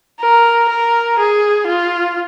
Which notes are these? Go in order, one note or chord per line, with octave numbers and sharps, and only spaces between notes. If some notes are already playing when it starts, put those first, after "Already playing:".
A#4
A#4
G#4
F4